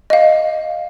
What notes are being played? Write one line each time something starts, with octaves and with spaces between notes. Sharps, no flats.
D#5 F5